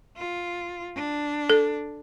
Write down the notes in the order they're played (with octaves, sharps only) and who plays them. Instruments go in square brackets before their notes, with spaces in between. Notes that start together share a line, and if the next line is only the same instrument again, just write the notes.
[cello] F4
D4
[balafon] A4